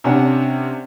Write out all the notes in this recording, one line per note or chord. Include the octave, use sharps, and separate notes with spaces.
C3 C#4 D4 F#5